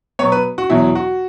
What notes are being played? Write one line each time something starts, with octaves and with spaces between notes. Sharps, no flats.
B2 F#3 B3 C#5
B4
F#4
E2 B2 F#3 E4
F#4